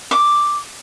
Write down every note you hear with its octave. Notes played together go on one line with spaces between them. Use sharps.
D6